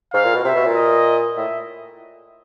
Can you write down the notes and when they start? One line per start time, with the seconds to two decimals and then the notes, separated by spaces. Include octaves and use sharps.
0.14 G#2 F5
0.25 A#2
0.34 B2
0.44 C3 E5
0.55 B2
0.65 A#2
0.75 D#5
1.37 A2 E5